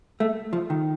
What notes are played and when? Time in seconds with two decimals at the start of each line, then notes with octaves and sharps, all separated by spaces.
0.20 A3
0.53 F3
0.70 D#3